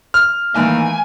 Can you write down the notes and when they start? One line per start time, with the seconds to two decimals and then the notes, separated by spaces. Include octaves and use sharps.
0.14 F6
0.56 A2 D#3 E3 A#3 G#5